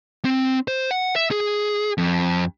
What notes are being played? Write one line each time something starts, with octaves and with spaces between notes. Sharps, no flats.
C4
C5
F#5
E5
G#4
F2